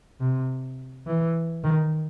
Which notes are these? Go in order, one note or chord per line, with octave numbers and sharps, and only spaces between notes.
C3
E3
D#3